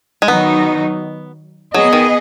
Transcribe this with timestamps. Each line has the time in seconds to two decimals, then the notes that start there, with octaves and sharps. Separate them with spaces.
0.22 G#3
0.28 D#3 F#3 B3 D#4
1.74 F#3 B3 G#4 D#5
1.93 D#3